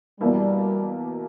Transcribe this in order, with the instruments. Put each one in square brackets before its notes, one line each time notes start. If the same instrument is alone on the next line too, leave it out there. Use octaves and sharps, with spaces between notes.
[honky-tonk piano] E2 B2 A#3 E4 [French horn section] G3